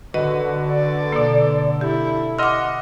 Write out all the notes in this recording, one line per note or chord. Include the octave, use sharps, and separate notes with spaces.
D3 F#4 B4 D#5
D5
B2 A#3 A4
E4 G4
D#5 F#5 C6 D6 E6 F6